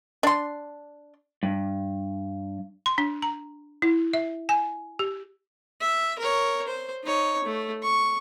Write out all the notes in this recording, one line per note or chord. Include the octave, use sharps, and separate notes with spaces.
D4 C6
G2
C6
D4
A#5
E4
E5
G#5
G4
E5
A#4 C#5
C5
D#4 C#5
A3
C#6